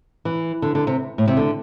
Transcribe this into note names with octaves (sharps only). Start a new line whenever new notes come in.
E3
D3
D3
C3
A2
C3
D3